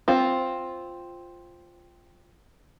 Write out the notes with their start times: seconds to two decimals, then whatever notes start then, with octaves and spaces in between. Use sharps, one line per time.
0.08 C4 F4